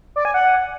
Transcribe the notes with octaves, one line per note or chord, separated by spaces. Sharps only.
D5
G#5
F#5